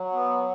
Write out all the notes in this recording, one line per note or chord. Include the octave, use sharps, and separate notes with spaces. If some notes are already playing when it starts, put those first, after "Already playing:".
Already playing: F#3
B3